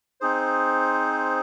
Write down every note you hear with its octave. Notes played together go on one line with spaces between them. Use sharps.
C4 D#4 G#4 C5